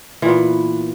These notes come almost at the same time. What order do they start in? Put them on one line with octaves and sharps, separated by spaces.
E3 A#2 B3